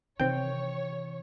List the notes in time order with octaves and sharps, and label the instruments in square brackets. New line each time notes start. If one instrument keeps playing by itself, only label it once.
[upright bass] C3 E3 [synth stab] D#3 C4 [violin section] C#5 [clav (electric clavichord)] G5